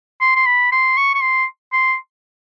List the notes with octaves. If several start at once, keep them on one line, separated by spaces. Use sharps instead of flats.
C6
C6
B5
C6
C#6
C#6
C6
C6